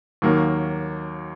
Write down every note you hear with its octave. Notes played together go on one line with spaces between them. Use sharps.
D#2 D#3 F#3 A#3